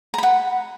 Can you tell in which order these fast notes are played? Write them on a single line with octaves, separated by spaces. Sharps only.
A#5 B5 F#5